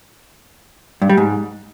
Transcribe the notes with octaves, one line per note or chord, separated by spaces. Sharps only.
G2
G3
G#2